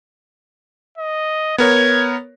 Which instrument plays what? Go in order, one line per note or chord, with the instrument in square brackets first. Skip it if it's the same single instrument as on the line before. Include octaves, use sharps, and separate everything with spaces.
[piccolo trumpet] D#5
[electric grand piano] B3 A#4 C#5 [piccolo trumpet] G#6